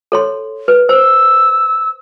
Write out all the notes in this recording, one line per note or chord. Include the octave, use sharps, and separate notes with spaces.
A4 C#5 C6
B4
C5 E6